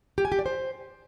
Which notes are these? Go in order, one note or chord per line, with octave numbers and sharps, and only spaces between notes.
G4
G#5
G4
D5
C5